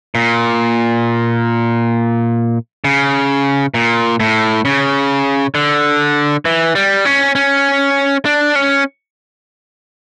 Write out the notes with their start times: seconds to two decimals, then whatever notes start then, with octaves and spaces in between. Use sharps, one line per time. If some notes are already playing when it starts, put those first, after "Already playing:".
0.15 A#2
2.84 C#3
3.74 A#2
4.20 A2
4.65 C#3
5.55 D3
6.45 E3
6.75 G3
7.05 C#4
7.35 C#4
8.25 D4
8.55 C#4